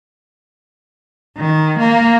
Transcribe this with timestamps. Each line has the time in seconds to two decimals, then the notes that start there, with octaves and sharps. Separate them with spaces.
1.37 D#3
1.80 A#3